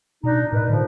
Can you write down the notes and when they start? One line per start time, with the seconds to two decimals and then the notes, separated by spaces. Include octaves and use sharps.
0.24 B2 D4 D#4
0.52 A2 D#4 A#4 B4
0.70 D3 F3